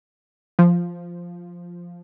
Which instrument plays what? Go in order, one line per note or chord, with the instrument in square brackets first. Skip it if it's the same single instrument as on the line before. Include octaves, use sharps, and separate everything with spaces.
[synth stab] F3